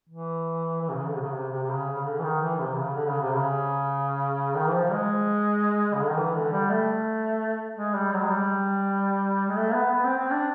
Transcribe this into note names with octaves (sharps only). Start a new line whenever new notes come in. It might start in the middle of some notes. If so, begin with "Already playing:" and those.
E3
E3
C3
C#3
D3
C3
C#3
C3
C3
C3
C#3
C#3
D3
E3
D#3
E3
C3
C#3
D3
C#3
C3
C#3
D#3
E3
F3
G#3
C#3
D3
D#3
E3
D3
G3
A3
G#3
G3
F#3
G#3
G3
G#3
A3
B3
B3
C4
C4
D4